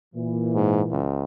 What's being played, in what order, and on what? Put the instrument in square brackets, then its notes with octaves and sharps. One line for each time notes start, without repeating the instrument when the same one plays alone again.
[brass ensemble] A#2 E3
[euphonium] G#2
C#2